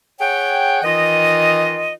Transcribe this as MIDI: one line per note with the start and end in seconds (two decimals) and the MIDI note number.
0.19 0.82 68
0.19 0.82 73
0.19 0.82 78
0.19 0.82 79
0.83 1.94 51
0.83 1.94 52
0.83 1.94 65
0.83 1.94 75